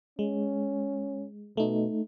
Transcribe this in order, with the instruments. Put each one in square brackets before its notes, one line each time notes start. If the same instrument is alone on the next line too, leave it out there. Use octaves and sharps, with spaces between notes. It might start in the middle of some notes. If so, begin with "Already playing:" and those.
[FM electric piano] G#3 [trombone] C#4
[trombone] B2 [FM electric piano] A3 D#4